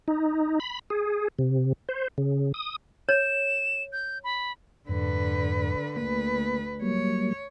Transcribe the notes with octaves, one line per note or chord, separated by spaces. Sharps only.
D#4
B5
G#4
C3
C5
C#3
D#6
C#5 E7
G6
B5
F2 G#2 D3 B4
D2 A#3 B4
F#3 G3 A#3 C#5